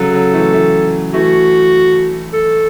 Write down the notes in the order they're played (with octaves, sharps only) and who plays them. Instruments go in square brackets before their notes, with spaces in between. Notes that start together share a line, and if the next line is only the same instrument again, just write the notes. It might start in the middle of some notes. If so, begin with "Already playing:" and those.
Already playing: [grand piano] C#3 F#3 [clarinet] A4
[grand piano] C#3 F#3
E3 A3
E3 A3
[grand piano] E3 A3 [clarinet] F#4
[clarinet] A4